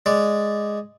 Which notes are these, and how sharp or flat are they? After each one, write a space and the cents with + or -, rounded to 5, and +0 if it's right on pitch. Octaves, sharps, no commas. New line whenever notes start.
G#3 +0 D5 +0